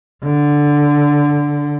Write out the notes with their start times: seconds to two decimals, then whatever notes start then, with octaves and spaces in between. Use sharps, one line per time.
0.23 D3